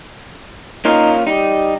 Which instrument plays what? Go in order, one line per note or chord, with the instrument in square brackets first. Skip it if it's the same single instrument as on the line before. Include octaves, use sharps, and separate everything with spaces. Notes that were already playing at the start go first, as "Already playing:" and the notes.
[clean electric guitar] A#3 C#4 F4 [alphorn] D#4
[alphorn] G3 [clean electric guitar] D#4